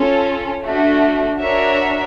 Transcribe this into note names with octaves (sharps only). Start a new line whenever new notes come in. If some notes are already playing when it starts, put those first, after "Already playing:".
Already playing: C#4 F4 A4
A3 D4 F#4
D4 F#4 A#4 C#5 E5